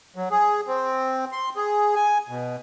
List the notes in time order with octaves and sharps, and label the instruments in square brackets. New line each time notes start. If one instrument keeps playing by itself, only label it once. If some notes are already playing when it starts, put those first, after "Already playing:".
[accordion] F#3
G#4
C4
C6
G#4
G#5
B2